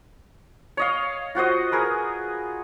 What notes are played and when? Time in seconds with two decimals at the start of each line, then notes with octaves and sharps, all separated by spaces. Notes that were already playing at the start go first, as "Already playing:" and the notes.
0.77 C#5 D#5 F5
1.35 F4 F#4 C5 D#5
1.72 G#4 A#4 B4